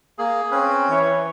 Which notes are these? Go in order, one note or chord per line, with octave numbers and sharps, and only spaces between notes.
A#3 G#4
C4 C#4 B4
E3 C#5